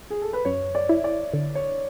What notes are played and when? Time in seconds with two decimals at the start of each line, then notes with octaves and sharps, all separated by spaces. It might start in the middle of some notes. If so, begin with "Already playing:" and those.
0.10 G#4
0.22 A4
0.33 B4
0.45 F#2 C#5
0.75 D5
0.89 E4
1.04 D5
1.33 D3
1.55 C#5